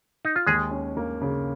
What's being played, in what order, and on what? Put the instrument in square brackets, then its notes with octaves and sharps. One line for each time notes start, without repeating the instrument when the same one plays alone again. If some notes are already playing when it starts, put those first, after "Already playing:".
[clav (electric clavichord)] D#4
F4
[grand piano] D#2 [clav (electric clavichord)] G#3 G#4
[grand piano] C#4
A#3
C#3